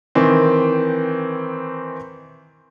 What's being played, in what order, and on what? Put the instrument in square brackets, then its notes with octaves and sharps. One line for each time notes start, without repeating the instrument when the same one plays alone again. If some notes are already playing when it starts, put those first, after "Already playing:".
[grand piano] D#3 E3 C4